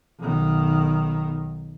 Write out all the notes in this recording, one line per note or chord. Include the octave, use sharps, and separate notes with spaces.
B1 D#3